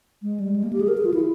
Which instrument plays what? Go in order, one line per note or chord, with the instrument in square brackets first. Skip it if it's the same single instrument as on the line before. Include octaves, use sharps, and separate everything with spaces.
[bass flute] G#3
G3
G#3
A#3
G4
G#4
A#4
G#4
F4
E4